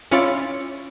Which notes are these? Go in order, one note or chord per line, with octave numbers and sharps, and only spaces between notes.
C#4 E4 F4 C#5 D5